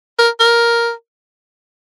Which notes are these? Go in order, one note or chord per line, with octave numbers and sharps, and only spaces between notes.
A#4
A#4